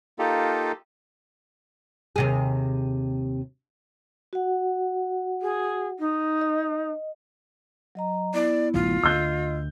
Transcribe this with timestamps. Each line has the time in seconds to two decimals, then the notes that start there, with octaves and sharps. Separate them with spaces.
0.19 A#3 D#4 F4 G4 A4
2.16 D#2 C3 G#4
4.33 F#4 F#5
5.42 G#4
5.99 D#4
6.41 D#5
7.95 F#3 D#5 A#5
8.34 B3 E4 D5
8.74 D1 A1 F#3 F4
9.03 D2 D3 D#5 E6 G6